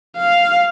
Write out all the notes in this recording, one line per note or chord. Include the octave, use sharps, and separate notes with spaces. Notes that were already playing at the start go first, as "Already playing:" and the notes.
F5